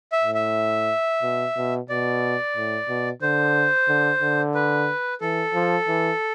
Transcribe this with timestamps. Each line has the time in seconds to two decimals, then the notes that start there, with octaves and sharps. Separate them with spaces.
0.12 E5
0.23 A2
0.35 E5
1.22 B2
1.57 B2
1.89 B2 D5
2.56 A2
2.89 B2
3.22 D3 C5
3.88 D3
4.21 D3
4.55 B4
5.21 E3 A4
5.54 F3
5.88 E3